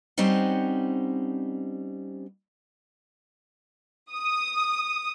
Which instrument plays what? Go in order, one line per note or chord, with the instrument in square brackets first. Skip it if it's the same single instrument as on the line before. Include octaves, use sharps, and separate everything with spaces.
[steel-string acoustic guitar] G3 C4 C#4 D#4 C5 F#5
[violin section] D#6